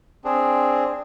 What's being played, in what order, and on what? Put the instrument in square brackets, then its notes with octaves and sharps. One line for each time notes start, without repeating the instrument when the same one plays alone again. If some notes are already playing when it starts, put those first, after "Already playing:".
[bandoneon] C4 D4 G#4